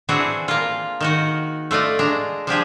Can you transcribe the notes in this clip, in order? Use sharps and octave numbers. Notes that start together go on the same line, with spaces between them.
E3 C4 D4 F#4 G#4
A#3 F4
D#3 D#4 F#4
A3 F4 D5 D#5
G#3 D4 A#5
F3 D4 G4 G#4